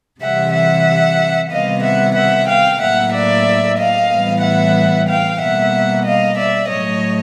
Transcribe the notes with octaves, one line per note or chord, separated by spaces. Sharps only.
C3 E3 G3 E5 F#5
E5 F#5
C3 D#3 G3 B3 D#5 F5
E5 F#5
E5 F#5
F5 G5
A2 F#3 A#3 E5 F#5
D5 E5
D#5 F5
A2 E3 G3 B3
E5 F#5
F5 G5
B2 G3 A#3 E5 F#5
D#5 F5
D5 E5
A2 F#3 A3 C#5 D#5